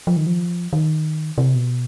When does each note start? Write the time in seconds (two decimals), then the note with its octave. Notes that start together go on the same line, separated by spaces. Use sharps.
0.07 F3
0.17 D#3
0.26 F3
0.73 D#3
1.38 C3
1.55 B2